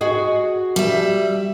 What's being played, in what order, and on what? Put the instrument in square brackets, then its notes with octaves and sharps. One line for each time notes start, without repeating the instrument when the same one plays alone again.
[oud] F#4 G#4 D#5
[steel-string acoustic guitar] G3 E5